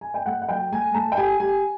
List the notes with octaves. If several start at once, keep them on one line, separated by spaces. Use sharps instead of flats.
G#5
G5
A3 F#5
F#5
F#3 G5
A3 G#5
A3 A5
G5
G4 G#5
G4 G#5